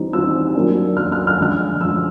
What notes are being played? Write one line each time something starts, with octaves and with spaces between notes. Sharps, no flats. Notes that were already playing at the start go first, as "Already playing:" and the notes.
Already playing: E3 G3 C4 D#4
E3 G3 C4 D#4 E6
F#3 A#3 D4
F#3 A#3 D4 F6
F6
F6
D3 F3 G#3 F6
D3 F3 G#3 E6